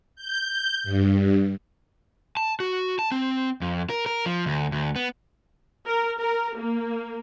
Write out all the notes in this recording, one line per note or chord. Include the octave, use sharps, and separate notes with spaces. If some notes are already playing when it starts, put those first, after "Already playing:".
G6
G2
A5
F#4
A5
C4
F2
A#4
A#4
F3
D2
D2
B3
A#4
A#4
A#3